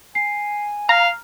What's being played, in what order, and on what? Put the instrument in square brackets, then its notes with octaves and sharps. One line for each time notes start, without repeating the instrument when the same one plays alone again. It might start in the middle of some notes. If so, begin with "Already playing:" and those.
[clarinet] G#5 [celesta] C7
[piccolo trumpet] F5 [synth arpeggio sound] A#5 [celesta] F6